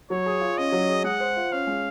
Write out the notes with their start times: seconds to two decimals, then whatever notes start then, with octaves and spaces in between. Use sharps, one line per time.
0.10 F#3 C#5
0.26 G#4
0.41 F4
0.57 C#4 D#5
0.72 F#3
0.89 G#4
1.04 G#3 F#5
1.20 C5
1.37 F4
1.52 C#4 F5
1.67 G#3